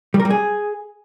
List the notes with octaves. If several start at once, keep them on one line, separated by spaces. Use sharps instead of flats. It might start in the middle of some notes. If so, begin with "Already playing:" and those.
G3
A#4
G3
G#4